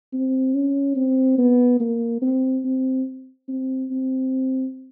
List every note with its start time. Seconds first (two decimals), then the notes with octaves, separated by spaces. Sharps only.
0.13 C4
0.54 C#4
0.96 C4
1.38 B3
1.80 A#3
2.22 C4
2.65 C4
3.48 C4
3.90 C4